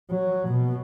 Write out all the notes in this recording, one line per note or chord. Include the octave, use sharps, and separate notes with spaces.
F#3
B2